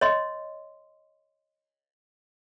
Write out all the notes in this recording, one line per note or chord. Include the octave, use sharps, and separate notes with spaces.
C#5 D#5 C6